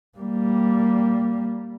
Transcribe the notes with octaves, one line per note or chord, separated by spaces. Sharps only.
G3 A#3